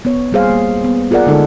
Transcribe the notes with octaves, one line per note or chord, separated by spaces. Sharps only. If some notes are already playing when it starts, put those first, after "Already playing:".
B3 C#5
G3 A#3 G#4 C5 F5
A#3
B3
F4 G#4 A#4 D5 F#5
D3 G#3 D#4 A4